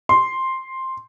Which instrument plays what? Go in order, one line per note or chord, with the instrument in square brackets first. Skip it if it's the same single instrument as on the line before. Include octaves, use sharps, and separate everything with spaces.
[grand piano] C6